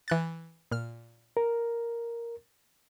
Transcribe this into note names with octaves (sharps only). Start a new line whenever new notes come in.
E3 F#6 A6
A#2 F6
A#4